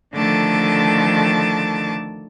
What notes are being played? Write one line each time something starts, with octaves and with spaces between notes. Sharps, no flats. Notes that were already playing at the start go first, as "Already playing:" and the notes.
D3 D#3 F3 A3 A5 D6